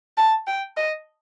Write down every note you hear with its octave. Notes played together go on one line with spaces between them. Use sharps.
A5
G5
D#5